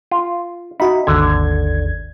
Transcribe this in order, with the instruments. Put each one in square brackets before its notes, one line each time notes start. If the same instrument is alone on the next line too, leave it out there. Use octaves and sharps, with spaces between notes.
[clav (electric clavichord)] F4
[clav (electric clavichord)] D#4 [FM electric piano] F#4 E5 B5
[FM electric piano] G#1 D#2 G#6 [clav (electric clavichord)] D3